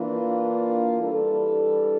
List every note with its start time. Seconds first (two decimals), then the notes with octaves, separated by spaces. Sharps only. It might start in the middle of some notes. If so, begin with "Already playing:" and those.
Already playing: E3 A#3 D4 F4
1.00 E3 G3 D4 A4